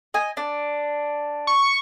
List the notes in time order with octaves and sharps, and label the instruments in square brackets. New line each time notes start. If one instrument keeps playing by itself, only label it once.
[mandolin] D#5 G#5
D4
[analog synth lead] C#6